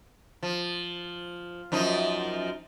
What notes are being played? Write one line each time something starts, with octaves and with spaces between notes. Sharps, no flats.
F3
F#2 F3 D#4